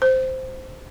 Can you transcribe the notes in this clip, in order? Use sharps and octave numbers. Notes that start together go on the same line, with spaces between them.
C5